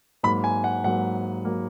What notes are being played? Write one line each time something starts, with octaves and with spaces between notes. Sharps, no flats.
G#2 F#3 A#3 B5
G#5
F#5
G#2 F#3 A#3 F#5
F#3 A#3